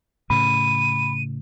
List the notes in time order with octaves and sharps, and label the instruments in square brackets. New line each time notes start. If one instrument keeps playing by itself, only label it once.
[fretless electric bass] A2 C#3 [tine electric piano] B5 [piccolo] D#7